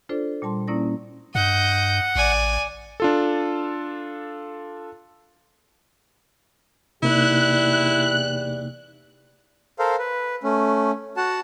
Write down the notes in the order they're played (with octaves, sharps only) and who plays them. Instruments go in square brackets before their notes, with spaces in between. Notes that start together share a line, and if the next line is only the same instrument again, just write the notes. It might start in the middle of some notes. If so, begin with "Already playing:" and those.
[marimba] D4 F4 A4 C5 D5
A#2 G3 A5 C6
A#3 C#4 E4 D5 D#6 A#6
[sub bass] G2 [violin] D#5 G6 [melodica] F#5
[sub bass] A1 [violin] D5 G#5
[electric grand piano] D4 F4 A4
[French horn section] E2 G4 D5 [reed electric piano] C3 A#3 D#4 [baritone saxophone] E4 [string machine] F#6
[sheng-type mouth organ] A4 A#4 C5 F5
B4
A3 C#4
F#4 F#5 A5